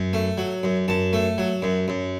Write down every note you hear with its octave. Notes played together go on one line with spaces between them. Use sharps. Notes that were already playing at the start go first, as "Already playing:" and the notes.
Already playing: F#2
A3
F#3
F#2
F#2 A5
A3
F#3
F#2
F#2